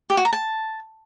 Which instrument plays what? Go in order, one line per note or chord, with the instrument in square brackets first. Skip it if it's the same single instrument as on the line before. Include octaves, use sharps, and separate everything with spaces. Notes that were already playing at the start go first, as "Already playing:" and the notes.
[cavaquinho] G4
F#4
A#5
A5